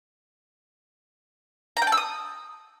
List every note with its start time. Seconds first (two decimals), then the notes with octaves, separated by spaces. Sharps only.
1.77 A#5
1.82 G5
1.87 A5
1.92 E6
1.97 D#6